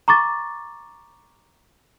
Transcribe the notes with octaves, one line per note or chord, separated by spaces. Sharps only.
A#5 C#6 D6 A6